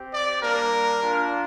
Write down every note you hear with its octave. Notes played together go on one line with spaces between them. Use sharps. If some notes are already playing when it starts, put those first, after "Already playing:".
Already playing: C4 G4
D5
G3 A#3 D4 A#4
A#3 D4 F4